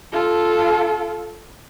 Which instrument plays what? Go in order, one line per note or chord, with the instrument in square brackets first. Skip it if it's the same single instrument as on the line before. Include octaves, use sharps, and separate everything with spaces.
[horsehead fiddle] F4 A4